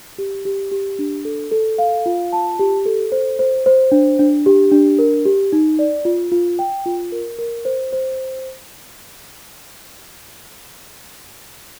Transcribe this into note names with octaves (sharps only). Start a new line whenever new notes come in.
G4
G4
G4
D4
A4
A4
F5
F4
A5
G4
A4
C5
C5
C5
D4
D4
G4
D4
A#4
G4
D#4
D5
F4
F4
G5
F4
A#4
A#4
C5
C5